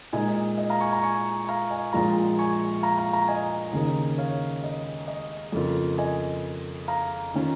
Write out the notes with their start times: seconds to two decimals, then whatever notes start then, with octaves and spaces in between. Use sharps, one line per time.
0.13 A#2 G#3 D#4 D#5 G#5
0.29 D#5
0.58 D#5
0.70 F5 A#5
0.81 G#5 C#6
0.92 F5 A#5
1.03 G#5 C#6
1.48 F5 A#5
1.70 D#5 G#5
1.93 A#1 A#2 G#3 F4 F5 A#5
2.39 G#5 C#6
2.83 F5 A#5
2.98 F5 A#5
3.13 F5 A#5
3.28 D#5 G#5
3.73 D#2 C#3 A#3 D#4
4.18 C#5 F5
4.64 D#5
5.08 D#5
5.52 F2 C#3 A#3 F4
5.98 D#5 G#5
6.88 F5 A#5
7.34 D#3 C#4 F4